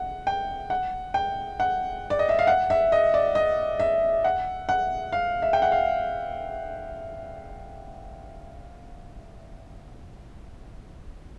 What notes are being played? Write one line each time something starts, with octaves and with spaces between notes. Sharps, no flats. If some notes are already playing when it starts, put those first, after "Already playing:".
Already playing: F#5
G5
F#5
G5
F#5
D5
D#5
E5
F5
F#5
E5
D#5
D5
D#5
E5
F#5
F#5
F5
E5
G5
F#5
F5